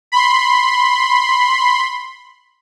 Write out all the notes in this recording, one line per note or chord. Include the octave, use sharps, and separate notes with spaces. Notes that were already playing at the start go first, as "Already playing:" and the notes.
B5 C6